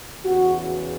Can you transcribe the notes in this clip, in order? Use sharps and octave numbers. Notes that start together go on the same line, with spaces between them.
E2 C#3 E3 F#4